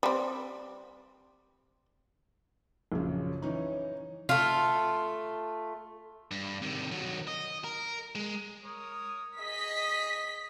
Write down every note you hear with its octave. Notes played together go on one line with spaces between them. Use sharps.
G3 C4
A#1 F#2 C#3
E3 C#4 D#4
A3 F4
G2
C3 D#3
D#3 F#3
D#5
A#4
G#3
A#4 C#5 D#6
G#4 D#5 B6